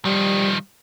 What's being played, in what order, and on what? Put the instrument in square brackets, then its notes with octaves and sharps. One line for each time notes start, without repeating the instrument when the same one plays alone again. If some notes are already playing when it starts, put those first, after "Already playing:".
[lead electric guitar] D#3 F3 [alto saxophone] G3